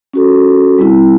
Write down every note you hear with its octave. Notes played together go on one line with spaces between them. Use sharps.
C#4 F#4 A4
G3 C4 E4